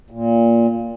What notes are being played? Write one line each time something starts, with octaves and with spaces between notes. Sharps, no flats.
A#2